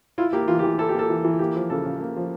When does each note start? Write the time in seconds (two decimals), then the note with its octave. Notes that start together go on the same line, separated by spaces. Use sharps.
0.18 E4 F4
0.33 A#3 G4
0.48 E3 F4
0.59 G4
0.63 E3
0.78 E4 A4
0.89 G4
0.94 A#3 A4
1.09 E3
1.25 E3
1.39 A#3 G4
1.55 F3
1.70 C#3 A4
1.86 C#3
2.00 A#3
2.16 F3